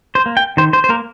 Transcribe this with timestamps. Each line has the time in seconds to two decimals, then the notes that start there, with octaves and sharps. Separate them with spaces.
0.15 C5
0.26 A#3
0.37 G5
0.57 D#3 C5
0.73 C5
0.84 C5
0.89 A#3 A#4